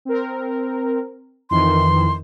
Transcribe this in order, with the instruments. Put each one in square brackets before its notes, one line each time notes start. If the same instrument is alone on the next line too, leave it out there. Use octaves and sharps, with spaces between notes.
[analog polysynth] C4 A#4
[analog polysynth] F2 D#3 E3 [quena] C6